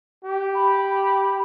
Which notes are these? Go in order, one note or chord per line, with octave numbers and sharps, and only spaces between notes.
G4
B5